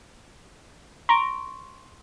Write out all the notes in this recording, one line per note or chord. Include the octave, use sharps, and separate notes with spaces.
A#5 C6 C#6 D7